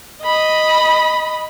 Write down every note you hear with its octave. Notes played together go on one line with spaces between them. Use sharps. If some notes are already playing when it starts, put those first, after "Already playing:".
D#5 B5